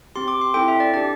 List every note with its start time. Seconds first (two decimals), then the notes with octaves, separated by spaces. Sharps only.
0.16 C4 G4 C6
0.28 D6
0.41 C6
0.54 C4 E4 A4 G5
0.68 E5
0.80 D5
0.94 D4 G4 D5